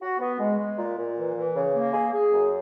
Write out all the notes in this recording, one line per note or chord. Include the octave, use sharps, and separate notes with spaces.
F#4
B3
G#3
G#3
A#2
A#2
E3
E3
C#3
A#3
G#4
G#4
F#2